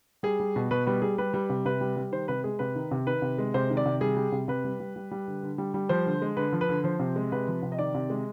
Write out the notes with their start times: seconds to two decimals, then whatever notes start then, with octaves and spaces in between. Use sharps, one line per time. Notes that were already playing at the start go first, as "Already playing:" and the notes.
0.23 G3 G#4
0.40 G3
0.56 B2
0.71 B2 B4
0.87 G3 B4
1.02 G3 G#4
1.18 G3 B4
1.34 G3
1.50 C3
1.65 C3 B4
1.81 G3
1.96 G3
2.12 D#3 C5
2.28 C3 B4
2.44 G#3 G#4
2.59 C3 B4
2.75 D#3
2.91 C3
3.07 D#3 B4
3.22 C3
3.38 G#3
3.54 C3 C5
3.70 D#3
3.77 D5
3.85 C3
4.01 G3 G#4
4.17 G3
4.32 C3
4.48 C3 B4
4.64 G3
4.80 G3
4.96 G3
5.11 G3
5.28 D3
5.43 D3
5.58 G3
5.74 G3
5.89 F3 C5
6.06 D3
6.22 G#3
6.37 D3 B4
6.53 F3
6.61 B4
6.69 D3
6.84 F3 C5
6.99 C3
7.16 G#3
7.32 C3 B4
7.48 F3
7.62 C3
7.72 D#5
7.78 D#3 D5
7.94 C3
8.10 G#3